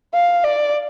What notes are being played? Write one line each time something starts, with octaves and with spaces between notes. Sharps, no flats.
F5
D5